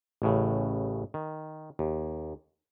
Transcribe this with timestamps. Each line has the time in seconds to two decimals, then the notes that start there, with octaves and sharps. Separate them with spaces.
0.22 A1 A2 C#3
1.14 D#3
1.79 D#2